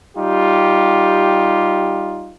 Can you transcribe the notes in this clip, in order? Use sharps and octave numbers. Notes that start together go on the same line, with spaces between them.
G3 D#4 F4 G4